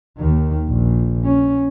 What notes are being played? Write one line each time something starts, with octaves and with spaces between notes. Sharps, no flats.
D#2 D#3
A#1
C#4